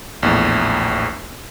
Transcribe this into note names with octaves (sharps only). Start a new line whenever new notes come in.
A#1 E2 A2